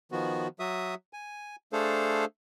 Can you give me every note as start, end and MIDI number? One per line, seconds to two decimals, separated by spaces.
0.12 0.48 51
0.12 0.48 53
0.12 0.48 59
0.12 0.48 66
0.60 0.94 54
0.60 0.94 66
0.60 0.94 76
0.60 0.94 87
1.13 1.56 80
1.73 2.25 57
1.73 2.25 62
1.73 2.25 68
1.73 2.25 69
1.73 2.25 72
1.73 2.25 77